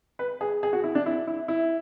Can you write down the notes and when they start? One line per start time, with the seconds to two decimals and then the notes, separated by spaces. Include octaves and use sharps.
0.19 B4
0.41 G#4
0.63 G#4
0.73 F#4
0.84 E4
0.95 D4
1.06 E4
1.27 E4
1.48 E4